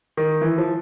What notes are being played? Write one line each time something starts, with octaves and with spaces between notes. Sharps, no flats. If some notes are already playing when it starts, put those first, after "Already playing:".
D#3
E3
F3